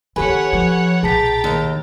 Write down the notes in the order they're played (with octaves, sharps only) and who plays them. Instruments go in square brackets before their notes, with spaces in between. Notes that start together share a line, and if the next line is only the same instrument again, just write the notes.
[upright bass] D#3 C4 [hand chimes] G4 A4 G#5 [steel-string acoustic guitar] B4 [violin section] C#5 F#5
[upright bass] F3
[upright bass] B1 A#2 [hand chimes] G#4 A5 B6 [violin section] G5 A#5 A6
[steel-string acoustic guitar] D#2